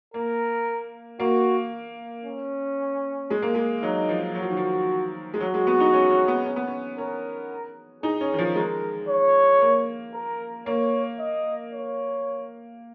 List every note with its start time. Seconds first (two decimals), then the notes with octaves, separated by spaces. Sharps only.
0.14 A#3 A#4
1.20 A#3 F#4
2.25 C#4
3.30 G#3
3.42 A#3
3.55 G#3
3.82 F#3 D#4
4.09 F3
4.35 F#3 F#4
4.42 F3
4.50 D#3
4.57 F3
5.34 G#3
5.40 F#3 F#4
5.54 G#3
5.67 B3
5.80 D#4
5.93 C#4
6.10 C#4
6.28 B3
6.46 C#4
6.56 B3
6.67 C#4
6.98 C#4 A#4
8.03 D#4 G#4
8.21 C#4
8.33 D#3
8.39 F3
8.56 G#3 A#4
9.09 C#5
9.61 A#3
10.14 A#4
10.66 A#3 C#5
11.19 D#5
11.72 C#5